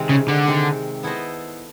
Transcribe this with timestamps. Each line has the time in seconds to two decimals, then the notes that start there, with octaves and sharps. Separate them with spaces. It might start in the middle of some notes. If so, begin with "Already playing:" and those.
Already playing: C3 D#3 G#3 C4
0.09 C#3
0.28 D3
0.47 C3 D#3 G#3 C4
1.03 B3 E4 A4 C5 D#5